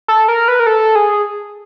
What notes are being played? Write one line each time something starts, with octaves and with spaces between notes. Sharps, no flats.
A4
A#4
B4
A#4
A4
G#4